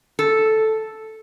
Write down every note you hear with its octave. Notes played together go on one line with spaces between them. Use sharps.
A4